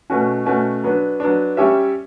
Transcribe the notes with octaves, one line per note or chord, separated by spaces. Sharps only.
B2 A3 C#4 F#4
B2 A3 C#4 F#4
F#3 B3 D4
F#3 B3 D4
G3 C#4 G4 C#5 E5